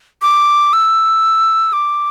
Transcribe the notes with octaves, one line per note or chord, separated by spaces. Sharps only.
D6
E6
D6